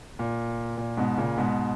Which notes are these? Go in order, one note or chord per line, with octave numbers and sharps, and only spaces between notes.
A#2
A#2
G#2 B2
A#2 C#3
G#2 B2